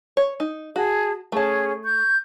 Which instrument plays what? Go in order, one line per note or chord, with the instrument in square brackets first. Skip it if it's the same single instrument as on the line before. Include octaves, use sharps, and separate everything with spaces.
[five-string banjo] C#5
D#4
[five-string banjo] F#4 [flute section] G#4 A5
[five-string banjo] A3 A5 [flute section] C#4 G#4 C#5
[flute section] C#6 G6